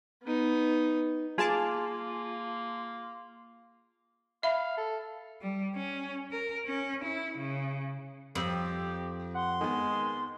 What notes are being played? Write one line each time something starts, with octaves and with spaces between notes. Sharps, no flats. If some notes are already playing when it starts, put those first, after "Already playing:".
B3 D#4
A#3 F4 G#4 G#5 A5 D6
E5 F5 B5
A4
G3
C#4
A#4
C#4
E4
C#3
F2 C4 G4
F#5 C6
D#3 G#3 B3